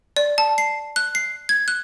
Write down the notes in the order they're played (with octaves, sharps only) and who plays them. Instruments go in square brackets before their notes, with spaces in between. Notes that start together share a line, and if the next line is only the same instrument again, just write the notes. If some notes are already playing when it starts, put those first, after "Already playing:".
[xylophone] D5
A5
C7
F#6
C7
G#6
F#6